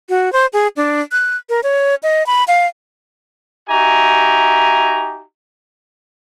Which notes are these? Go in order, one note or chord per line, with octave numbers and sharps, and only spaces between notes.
F#4
C5
G#4
D4
F#6
A#4
C#5
D#5
B5
F5
D#4 F#4 G4 E5 G#5 A#5